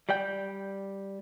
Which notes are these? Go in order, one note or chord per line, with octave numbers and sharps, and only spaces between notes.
G3 D5 G5